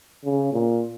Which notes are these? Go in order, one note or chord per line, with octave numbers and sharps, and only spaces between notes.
C#3
A#2